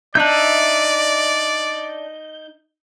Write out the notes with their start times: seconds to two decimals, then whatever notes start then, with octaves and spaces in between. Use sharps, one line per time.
0.15 D4 D#4 D5 E5 G6